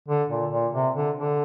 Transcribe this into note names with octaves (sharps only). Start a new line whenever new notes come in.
D3
A#2
A#2
C3
D3
D3